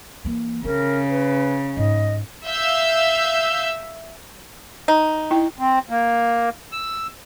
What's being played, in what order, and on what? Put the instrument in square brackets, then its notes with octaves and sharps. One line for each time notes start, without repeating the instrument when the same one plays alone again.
[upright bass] E3 A#3
[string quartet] C#3 [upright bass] C#4 [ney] A#4
[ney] B4
[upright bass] G#2 [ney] D#5
[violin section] E5 F5 E6 G6
[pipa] D#4
[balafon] E4 G5
[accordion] C4
A#3
E6